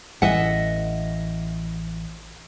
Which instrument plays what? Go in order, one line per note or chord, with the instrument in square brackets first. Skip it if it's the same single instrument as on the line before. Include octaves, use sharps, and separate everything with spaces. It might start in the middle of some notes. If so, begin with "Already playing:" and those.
[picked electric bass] A1 E3 [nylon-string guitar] D#5 E5 F#5